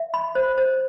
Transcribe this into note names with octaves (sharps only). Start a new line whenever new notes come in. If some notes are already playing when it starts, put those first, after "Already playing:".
Already playing: E5
B5
C5
C5